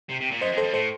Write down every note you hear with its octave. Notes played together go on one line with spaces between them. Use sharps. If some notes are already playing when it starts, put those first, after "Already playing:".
C3
C3
A#2
F#2 C5 D#5
F2
A4 C5
F2
A2 A4 C5